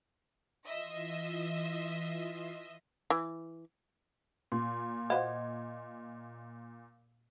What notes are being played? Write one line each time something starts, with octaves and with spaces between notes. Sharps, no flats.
E3 F4 D#5 E5 C6
E3
A#2 C6
A#3 F#4 C5 D#5